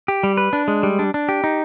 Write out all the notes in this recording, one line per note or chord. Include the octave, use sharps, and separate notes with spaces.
G4
G3
B4
D4
G#3
G3
D4
D4
G4
D#4